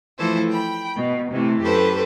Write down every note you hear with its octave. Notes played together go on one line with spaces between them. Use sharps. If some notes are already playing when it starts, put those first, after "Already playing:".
E3 F3 A3 E4 A4 C5
G5 B5
B2
C3 E3 A3
F#2 G4 A4 B4 C5